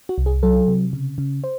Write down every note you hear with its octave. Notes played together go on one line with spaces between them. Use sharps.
F#4
C2
G#4
F#3 A4
C3
C#3
C#3
C5